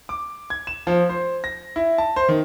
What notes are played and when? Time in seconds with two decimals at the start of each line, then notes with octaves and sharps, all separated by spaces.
0.09 D6
0.50 G#6
0.67 E7
0.87 F3
1.09 C5
1.44 A#6
1.76 E4
1.98 A5
2.16 C5
2.29 D#3